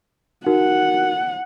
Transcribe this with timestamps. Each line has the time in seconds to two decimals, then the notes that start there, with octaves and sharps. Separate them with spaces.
0.46 D#4 F#4 A#4 F#5